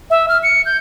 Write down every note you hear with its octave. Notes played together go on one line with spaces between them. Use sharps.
E5
F6
C#7
G6